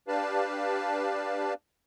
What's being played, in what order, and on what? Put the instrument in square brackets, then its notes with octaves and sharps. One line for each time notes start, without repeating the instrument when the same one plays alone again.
[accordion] D4 G4 B4 D5 F5 A5